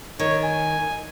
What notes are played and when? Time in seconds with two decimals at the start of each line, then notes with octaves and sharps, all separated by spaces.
0.20 D#3 C#5
0.43 G#5